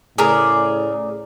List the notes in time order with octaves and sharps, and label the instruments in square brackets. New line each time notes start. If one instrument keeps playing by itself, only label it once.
[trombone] A2 [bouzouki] C#3 D5 [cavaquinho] G#4 A#4